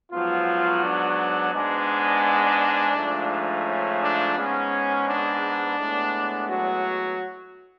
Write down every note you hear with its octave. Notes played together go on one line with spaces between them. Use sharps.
G#2 F3 F#3 B3 F4
D4
G#2 G#3 B3 D4
G#2 F3 A3
C#4
D4
G#2 G#3 B3 C#4
D4
A2 G#3 B3
F#3 F#4